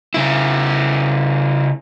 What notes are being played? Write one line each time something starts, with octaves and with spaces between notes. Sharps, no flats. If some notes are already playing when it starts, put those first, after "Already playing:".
C#3 E4